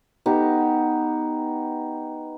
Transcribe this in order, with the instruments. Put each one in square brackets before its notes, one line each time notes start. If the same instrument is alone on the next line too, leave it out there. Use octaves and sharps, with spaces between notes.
[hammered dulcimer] B3 D#4 G4